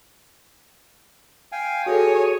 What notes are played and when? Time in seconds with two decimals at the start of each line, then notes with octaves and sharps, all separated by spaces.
1.52 F5 G5 G#5
1.86 F#4 G#4 A4 C#5 G#5 D#6